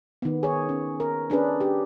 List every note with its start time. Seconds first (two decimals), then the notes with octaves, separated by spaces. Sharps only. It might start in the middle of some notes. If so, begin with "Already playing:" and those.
0.22 D#3 B3
0.43 G#4 C#5
0.69 C#4
1.00 A#4
1.30 C#4 D4 G#4 B4
1.61 G4